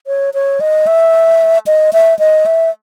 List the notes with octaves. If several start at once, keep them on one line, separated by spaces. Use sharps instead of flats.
C#5
C#5
D#5
E5
D#5
E5
D#5
E5